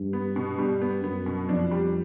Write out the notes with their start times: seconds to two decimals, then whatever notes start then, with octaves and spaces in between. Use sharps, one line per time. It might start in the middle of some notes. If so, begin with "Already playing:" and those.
Already playing: G2
0.13 B3
0.36 B2
0.59 G2 G3
0.81 B3
1.04 F#2 B3
1.26 B2
1.48 F2 D4
1.71 G3